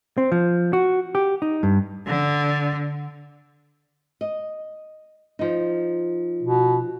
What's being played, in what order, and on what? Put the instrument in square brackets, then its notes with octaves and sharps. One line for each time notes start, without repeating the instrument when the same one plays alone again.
[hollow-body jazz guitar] C4
F3
F#4
G4
D#4
G2
[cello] D3
[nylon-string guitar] D#5
F3 D#4
[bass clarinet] B2